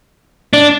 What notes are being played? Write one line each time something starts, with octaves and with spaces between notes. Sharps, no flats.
D4